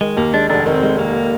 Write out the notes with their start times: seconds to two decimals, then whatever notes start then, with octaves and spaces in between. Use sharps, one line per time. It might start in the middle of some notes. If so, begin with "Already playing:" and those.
0.01 D#3 G#3
0.17 D#2 A#3
0.33 G#3 D4
0.49 F1 D4
0.66 D#3 C4
0.83 G#3
0.98 D#3 A#3